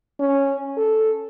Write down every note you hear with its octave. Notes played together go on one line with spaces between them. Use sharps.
C#4
A4